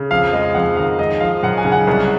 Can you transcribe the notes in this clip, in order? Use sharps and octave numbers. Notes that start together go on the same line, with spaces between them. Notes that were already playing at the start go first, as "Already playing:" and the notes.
Already playing: C#3
F2 F5
G#3 D#5
F2 F#5
D#3 F5
G#3 D#5
F3 F5
F#2 F#5
G#5
C#3
F#5
C2